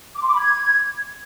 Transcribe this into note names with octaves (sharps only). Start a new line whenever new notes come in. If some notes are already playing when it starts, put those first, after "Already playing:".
D6
C6
D6
B5
G#6